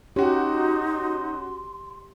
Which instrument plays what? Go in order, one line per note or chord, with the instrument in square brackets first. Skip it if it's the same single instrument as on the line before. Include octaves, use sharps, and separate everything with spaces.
[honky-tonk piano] C#4 F#4 [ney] D#4 [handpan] G4 [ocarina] C6